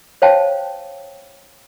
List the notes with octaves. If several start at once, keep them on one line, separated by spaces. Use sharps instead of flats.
C5 C#5 F5 G5 A5